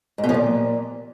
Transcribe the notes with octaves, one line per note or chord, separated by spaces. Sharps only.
G#2
B2
F3
A#2